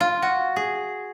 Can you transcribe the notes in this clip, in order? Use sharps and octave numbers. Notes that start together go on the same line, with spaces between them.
F4
F#4
G#4